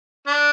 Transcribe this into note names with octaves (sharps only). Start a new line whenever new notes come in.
D4